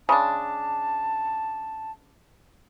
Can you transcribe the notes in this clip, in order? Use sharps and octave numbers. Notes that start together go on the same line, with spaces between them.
C#3 G#3 D4 A5